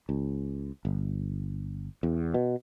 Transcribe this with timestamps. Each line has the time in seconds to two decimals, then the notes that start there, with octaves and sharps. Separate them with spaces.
0.09 C#2
0.85 G1
2.03 E2
2.34 B2